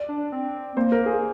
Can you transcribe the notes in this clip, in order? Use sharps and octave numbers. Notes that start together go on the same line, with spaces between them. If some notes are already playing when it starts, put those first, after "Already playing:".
Already playing: D5
D4
C4
A#3 C5
A#4
G#4